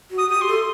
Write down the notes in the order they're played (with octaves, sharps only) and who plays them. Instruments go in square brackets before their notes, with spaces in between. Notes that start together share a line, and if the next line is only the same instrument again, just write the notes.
[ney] F#4
[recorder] D#6
[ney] G4 [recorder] D#6
[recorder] C6
[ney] A4